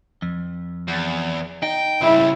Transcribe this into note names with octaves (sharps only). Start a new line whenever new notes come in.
F2
E2
D#4 G5
C#3 G3 E4